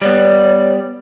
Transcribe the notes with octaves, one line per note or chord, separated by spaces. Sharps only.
G3 B3 C#5 D5